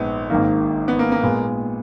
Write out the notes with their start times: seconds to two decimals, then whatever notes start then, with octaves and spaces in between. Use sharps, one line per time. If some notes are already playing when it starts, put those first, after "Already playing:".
Already playing: A#1 G#2 G#3 B3
0.30 G#1 G#2 D#3 A#3
0.88 B3
0.99 A#3
1.12 A#3
1.23 A#2 G#3 B3